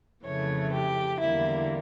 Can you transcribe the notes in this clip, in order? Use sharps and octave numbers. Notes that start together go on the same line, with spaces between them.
F2 C#3 E3 A3 C#5
G4
E2 D3 G3 A#3 E4